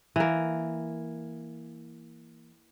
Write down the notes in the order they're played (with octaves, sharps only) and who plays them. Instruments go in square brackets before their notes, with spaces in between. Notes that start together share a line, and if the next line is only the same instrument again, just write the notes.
[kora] E3 A#3